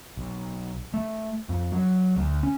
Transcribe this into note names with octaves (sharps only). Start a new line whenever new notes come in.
B1
A3
F2
F#3
D2
C#4